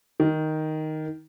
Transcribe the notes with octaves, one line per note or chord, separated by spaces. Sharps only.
D#3